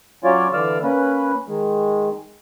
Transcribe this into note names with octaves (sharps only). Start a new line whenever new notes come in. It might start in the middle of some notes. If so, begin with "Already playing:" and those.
F#3 C#4 F4 C#5 D5
D3 E3 D5 F5 E6
A#3 C#4 B4
D#3 G#3